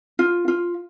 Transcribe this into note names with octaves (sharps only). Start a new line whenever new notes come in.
F4
F4